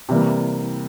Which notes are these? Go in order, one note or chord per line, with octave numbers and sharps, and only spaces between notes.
C3 E3 G3 A#3